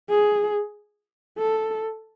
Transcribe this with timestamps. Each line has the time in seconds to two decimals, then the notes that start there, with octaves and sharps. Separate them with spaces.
0.10 G#4
1.38 A4